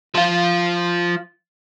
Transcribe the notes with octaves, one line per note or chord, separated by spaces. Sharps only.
F3 F4